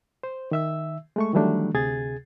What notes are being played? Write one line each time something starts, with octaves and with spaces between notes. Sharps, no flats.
C5
D#3 E5 E6
G#3 A3 C#6
D#3 E3 F#3 G3 A3 D4
D2 C3 G#4 G#6 A6